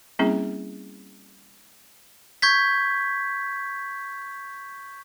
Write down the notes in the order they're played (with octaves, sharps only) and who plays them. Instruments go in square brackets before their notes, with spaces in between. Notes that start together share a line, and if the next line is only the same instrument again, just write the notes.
[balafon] G3 A#3 C4 C#4 E4 G#4
[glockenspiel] C#6 G6 G#6 B6